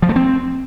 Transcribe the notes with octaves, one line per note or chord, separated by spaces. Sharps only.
F3
A3
C4